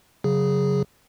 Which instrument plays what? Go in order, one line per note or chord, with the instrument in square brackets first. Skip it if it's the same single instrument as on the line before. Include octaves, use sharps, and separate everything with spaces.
[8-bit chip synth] C#3 F#3 G#4